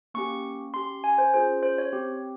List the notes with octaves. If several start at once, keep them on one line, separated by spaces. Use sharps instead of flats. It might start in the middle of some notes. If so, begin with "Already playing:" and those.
A#3 C#4 G4 C#6
C#4 G4 C6
G#5
C5
C#4 F4 G#4 C5
C5
C#5
C4 G4